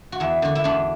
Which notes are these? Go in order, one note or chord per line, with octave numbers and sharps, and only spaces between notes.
F#4
E2 E4
D3 F#4
E4
E2 D4